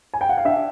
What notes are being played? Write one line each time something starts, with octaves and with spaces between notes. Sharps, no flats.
G#5
G5
F#5
F5
D4 E5